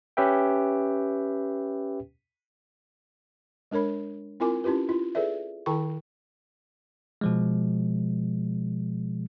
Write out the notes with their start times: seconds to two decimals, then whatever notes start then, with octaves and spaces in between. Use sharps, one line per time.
0.17 C#4 G4 B4 E5 G5
3.71 G#3 D4 A#4 C#5 B5
4.40 C4 E4 F4 A#4 G#5 D6
4.64 C#4 E4 F4 G4 B4
4.89 E4 F4
5.15 G#4 A4 B4 D5 E5
5.66 D#3 E4 A4 G5 A5 C#6
7.21 B2 F3 G#3